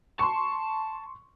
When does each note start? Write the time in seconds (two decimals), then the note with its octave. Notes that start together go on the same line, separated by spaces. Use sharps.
0.19 A5 C6 C#6